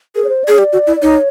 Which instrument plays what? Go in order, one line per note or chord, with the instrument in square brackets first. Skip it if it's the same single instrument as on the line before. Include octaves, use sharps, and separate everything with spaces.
[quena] G#4 [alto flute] A#4
[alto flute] C#5
C5
D5
[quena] G#4 [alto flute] C#5
[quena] G4 [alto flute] D5
[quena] F#4
E4
[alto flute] D5
[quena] D#4 [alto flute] C#5